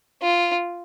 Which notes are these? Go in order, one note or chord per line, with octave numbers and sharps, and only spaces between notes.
F4